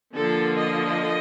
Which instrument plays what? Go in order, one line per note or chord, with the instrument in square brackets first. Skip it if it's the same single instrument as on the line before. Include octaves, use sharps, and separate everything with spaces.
[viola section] D3 F3 A#3 A4
D#5